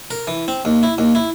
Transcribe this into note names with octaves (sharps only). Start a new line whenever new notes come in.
A#4
E3
C4
D#2
E4
D#2
E4